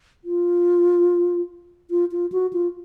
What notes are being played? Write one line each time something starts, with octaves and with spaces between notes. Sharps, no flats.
F4
F4
F4
F#4
F4